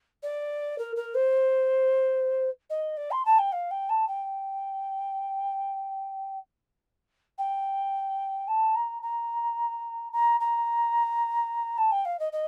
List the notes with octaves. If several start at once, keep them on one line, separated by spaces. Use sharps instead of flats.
D5
A#4
A#4
C5
D#5
D5
C6
A5
G5
F5
G5
A5
G5
G5
A5
A#5
A#5
A#5
A#5
A5
G5
F5
D#5
D#5